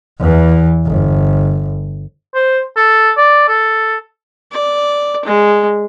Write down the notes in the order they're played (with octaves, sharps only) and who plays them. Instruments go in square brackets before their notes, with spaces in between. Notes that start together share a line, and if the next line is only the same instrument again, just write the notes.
[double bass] E2 E3
G1
[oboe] C5
A4
D5
A4
[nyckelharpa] D5
G#3